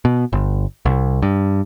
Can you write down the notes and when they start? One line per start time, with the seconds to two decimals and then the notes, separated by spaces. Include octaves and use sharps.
0.05 B2
0.33 G1
0.86 C2
1.22 G2